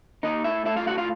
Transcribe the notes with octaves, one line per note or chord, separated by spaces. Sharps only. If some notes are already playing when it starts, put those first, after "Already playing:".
A#3 D#4 D#5
A2 E4 E5
A3 E4 E5
F4 F5
A2 F#4 F#5
F4 F5